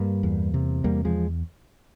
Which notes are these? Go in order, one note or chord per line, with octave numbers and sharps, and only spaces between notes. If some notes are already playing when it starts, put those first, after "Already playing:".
Already playing: G2 G3 A#3
E2
C3
E2 G3 A#3
F3 G#3